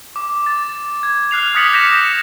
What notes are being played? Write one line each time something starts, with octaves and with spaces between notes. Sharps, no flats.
D6
A6
G#6
F6 F#6 C7 F7
D6 D#6 A6 B6 C#7 F#7
G6 A#6 B6 C#7 E7